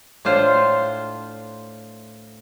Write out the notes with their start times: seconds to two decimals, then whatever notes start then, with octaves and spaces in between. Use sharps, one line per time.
0.25 A2 D4 F4 C5